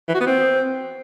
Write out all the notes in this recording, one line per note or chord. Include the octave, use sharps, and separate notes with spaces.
E3
F#4
B3
C4